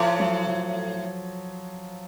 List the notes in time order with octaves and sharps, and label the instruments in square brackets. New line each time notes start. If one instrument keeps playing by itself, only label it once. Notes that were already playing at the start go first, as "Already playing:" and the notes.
Already playing: [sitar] A2 [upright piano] F3
[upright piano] F#3
F3